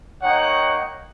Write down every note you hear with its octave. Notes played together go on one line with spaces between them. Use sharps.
A#3 D#4 C#5 F#5 G5